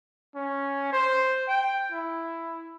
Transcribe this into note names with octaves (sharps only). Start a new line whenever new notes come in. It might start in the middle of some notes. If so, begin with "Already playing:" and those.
C#4
C5
G5
E4